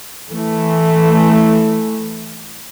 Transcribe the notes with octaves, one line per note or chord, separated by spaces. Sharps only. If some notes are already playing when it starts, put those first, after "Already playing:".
E3 A3